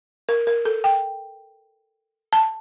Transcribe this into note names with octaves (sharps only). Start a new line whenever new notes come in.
A#4
A#4
A4
G5
A5